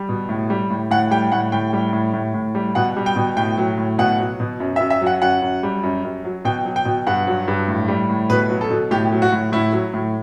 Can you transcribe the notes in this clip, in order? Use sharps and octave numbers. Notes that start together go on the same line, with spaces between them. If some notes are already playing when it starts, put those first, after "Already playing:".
Already playing: G3
B2
A2
G3
A2
A2 F#5
G3 G5
A2 F#5
A2 G5
G3
A2
A2
A2
G3
B2 F#5
G3
G5
B2
A2 G5
F#3
A2
B2 F#5
F#3
B2
F#2
E5
F#2
E5
F#3
F#5
F#2 F#5
F#2
G3
F#2
F#2
F#3
B2 G5
F#3
G5
B2
G2 F#5
F#3
G2
A2
G3
A2
B2 B4
F#3
A4
B2
A2 G4
F#3
F#4
A2
A2 E4
F#3
A2